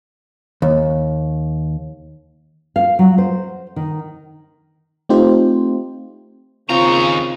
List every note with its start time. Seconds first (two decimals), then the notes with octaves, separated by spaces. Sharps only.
0.62 D#2
2.76 F5
2.99 F#3
3.18 C5
3.76 D#3
5.09 A3 C4 D#4 F4 G4 C5
6.69 D#2 C#3 C4 F4 A#5 C#6